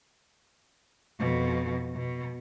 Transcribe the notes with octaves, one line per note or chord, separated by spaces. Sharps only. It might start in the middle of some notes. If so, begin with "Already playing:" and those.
F2 B2
B2